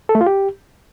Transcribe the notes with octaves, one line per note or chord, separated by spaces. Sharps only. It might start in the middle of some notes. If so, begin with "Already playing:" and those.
A4
A3
F4
G4